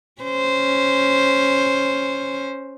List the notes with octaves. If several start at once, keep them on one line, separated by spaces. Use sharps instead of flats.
C#4 C5